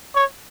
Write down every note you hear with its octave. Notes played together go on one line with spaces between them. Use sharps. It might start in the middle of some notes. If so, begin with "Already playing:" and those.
C#5